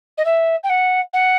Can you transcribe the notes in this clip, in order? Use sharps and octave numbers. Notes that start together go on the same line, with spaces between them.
D#5
E5
G5
F#5
F#5